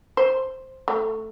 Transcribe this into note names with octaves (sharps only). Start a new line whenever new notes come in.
C5
A3